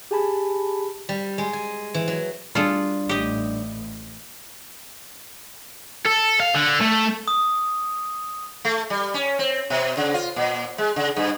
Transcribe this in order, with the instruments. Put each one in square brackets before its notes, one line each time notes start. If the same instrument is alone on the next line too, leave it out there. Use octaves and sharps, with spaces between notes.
[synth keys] G4 G#4 G#5 A5 B5
[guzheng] G3
G#3
G#5
E3
F#3
[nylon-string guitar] G3 D4 [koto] F4 G#4 A4
[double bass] A1 A2 [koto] G4 D#5
[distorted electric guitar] A4
F5
D3
A3
[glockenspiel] D#6
[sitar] A3
G3
C#4
C4
B2
C#3
F4
A#2
G#3
C#3
G2